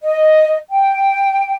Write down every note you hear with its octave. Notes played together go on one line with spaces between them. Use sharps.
D#5
G5